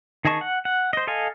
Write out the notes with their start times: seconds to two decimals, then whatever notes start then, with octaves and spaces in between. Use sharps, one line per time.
0.25 D#3 G#4 D#5 A5 C#6
0.41 F#5
0.65 F#5
0.93 C5 D#5
1.07 A4 D#5 F5 G#5